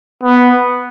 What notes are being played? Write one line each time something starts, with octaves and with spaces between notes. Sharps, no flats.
B3